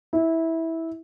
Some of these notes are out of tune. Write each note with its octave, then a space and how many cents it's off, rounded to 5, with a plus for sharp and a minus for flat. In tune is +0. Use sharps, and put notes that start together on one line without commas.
E4 -15